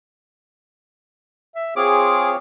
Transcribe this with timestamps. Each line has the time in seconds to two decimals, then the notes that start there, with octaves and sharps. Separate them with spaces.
1.55 E5
1.76 C4 F4 G#4 C#5 D6